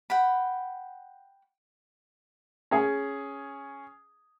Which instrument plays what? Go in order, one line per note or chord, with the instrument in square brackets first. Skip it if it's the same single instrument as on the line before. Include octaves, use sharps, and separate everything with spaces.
[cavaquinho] F#5 G5 B5
[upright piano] C#4 G#4